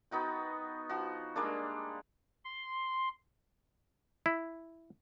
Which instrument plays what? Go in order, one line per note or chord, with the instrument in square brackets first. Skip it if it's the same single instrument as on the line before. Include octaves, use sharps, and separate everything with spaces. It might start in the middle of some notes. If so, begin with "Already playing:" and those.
[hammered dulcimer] B3 D#4 F#4 G5
F3 F#4
G3 G#3 A#3 D4
[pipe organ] C6
[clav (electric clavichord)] E4